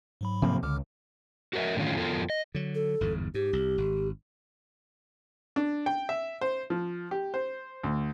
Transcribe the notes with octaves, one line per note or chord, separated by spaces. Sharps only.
G#2 F#3 B5
C3 F3 A#3
C#2 D3 D6 F6
F#4 G4 A#4 C5 D#5 E5
A2 D3 D#3 C#4 F4
F2 B3 F4 A4 A#4
D#5
D3 F#3
A4
G1 E2 G#2
G#2 G4
C2
G#1
D4
G5
E5
C5
F3
G4
C5
D2